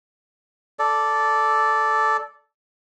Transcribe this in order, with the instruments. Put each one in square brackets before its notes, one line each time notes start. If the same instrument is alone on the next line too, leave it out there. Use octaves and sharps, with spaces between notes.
[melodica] A4 D5